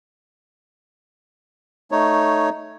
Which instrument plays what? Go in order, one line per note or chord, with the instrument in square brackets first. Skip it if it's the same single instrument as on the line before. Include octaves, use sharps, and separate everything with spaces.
[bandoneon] A3 D#4 C#5